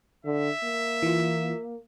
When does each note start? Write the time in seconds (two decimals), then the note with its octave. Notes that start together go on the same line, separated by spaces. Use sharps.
0.25 D3 E5
0.63 A#3
1.03 E3 F4